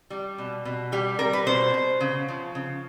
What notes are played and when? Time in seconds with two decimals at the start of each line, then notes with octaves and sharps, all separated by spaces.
0.10 G3
0.38 B2
0.65 B2
0.92 G3 G4
1.19 G3 A#4
1.33 B4
1.47 B2 C5
1.74 B2
2.01 C#3
2.28 F3
2.55 C#3